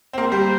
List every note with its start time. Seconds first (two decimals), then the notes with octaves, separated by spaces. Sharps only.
0.13 C4
0.18 A#3 C5
0.32 G3